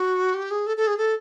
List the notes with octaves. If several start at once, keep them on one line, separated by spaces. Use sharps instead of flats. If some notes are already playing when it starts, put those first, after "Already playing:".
Already playing: F#4
G4
G#4
A4
A4
G#4
A4